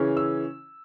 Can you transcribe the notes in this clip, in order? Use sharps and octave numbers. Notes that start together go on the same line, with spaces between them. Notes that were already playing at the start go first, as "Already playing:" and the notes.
Already playing: C#3 E3 C#4
E6